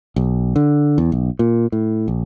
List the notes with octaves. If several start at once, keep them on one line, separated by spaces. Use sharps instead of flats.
B1
D3
E2
B1
A#2
A2
A#1